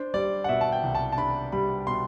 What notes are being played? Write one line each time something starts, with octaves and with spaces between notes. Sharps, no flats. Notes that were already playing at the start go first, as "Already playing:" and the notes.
Already playing: D4 C5
G3 D5
F#5
B2 E5
A5
G5
C2
A5
A5
D4 B5
G3 B5
B2 C6